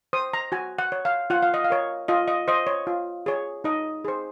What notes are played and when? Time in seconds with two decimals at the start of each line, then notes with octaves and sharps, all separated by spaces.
0.13 C5 D#6
0.34 A#5
0.52 F#4 G#5
0.79 F#5
0.92 C#5
1.05 F5
1.30 F4 F#5
1.42 F5
1.54 D#5
1.64 F5
1.70 A#4 C#5
2.08 F4 D#5
2.28 D#5
2.48 C5 D#5
2.67 C#5
2.87 F4
3.26 G#4 C#5
3.64 D#4 D#5
4.05 G#4 C5